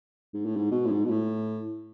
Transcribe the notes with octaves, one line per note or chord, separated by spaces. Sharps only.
G#2
A2
G#2
B2
A2
G#2
B2
A2